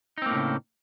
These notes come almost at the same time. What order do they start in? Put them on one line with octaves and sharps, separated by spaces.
D#4 C4 A#3 A2 C#3